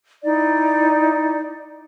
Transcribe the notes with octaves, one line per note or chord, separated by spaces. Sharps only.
D#4 E4 D5